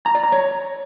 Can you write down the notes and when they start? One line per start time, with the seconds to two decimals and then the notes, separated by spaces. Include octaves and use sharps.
0.06 A#5
0.15 D5
0.24 A#5
0.32 C#5